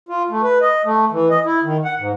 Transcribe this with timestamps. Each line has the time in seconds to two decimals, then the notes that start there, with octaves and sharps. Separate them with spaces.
0.09 F4
0.30 A3
0.43 B4
0.61 D#5
0.85 A3
1.12 E3
1.30 D#5
1.45 E4
1.63 D#3
1.85 F#5
1.99 G#2